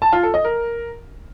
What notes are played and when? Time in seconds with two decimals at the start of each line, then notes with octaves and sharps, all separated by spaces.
0.02 A5
0.12 F4
0.23 A4
0.34 D#5
0.44 A#4